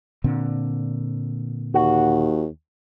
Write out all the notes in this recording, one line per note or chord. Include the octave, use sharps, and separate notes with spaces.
A#2 D3 C4
D#2 F#4